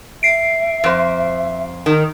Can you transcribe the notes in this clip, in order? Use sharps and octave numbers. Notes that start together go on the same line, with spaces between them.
E5 C7 D7
F2 C5
D#3